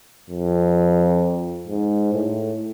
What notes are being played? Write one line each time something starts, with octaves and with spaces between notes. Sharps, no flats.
F2
G#2
A2